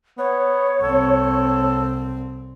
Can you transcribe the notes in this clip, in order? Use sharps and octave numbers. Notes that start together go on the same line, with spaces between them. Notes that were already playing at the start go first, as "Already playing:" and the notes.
B3 C#5
C2 C4 A4